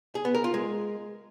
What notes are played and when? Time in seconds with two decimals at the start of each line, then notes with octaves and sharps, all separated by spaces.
0.15 G#4
0.25 B3
0.35 A#4
0.44 F4
0.54 G#3